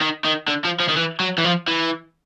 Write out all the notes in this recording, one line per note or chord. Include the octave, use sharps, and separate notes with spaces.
D#3
D#3
D3
F3
F3
D#3
E3
F#3
E3
F3
E3